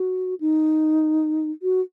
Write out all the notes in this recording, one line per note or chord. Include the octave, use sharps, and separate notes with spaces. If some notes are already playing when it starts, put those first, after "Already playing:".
Already playing: F#4
D#4
F#4